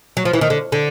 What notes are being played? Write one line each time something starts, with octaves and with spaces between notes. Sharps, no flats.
F#3
F3
E3
D#3
D3
D3